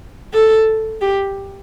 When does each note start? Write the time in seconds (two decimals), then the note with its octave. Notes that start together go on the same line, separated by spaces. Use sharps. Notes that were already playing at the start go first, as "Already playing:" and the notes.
0.33 A4
1.01 G4